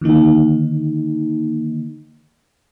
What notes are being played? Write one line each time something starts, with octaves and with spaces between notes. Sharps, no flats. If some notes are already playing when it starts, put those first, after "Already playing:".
D3 D#3 A#3 D#4